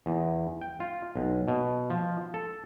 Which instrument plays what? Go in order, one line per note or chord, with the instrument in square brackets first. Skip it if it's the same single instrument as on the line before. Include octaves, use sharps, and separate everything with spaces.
[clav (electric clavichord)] E2
G5
F4
B1
B2
F3
A4